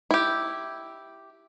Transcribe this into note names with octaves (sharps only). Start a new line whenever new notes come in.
E4 G4